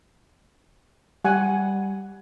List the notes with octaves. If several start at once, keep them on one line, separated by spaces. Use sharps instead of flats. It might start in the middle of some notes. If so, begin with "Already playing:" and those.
G3 F#5 G#5